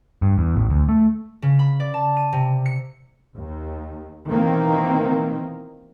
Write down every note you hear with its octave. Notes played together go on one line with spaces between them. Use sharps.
G2
E2
A1
D2
A3
C#3
B5
D5
A5
D#7
C3
C#7
D#2
B2 D#3 E3 A#3 C4